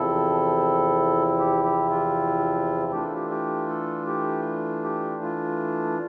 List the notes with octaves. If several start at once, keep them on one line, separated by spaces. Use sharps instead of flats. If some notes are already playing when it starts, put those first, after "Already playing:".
Already playing: E2 C3 F3 C4 E4 A4
G4
G4
F4
E3 A3 D4 F4 G4
A4
G4
G4
A4
G4
G4
F4